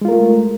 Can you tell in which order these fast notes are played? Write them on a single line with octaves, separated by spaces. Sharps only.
G#3 F4 A#4 A3